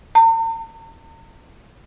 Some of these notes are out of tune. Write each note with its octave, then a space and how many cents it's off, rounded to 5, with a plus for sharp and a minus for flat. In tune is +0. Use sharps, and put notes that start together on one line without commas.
A#5 -45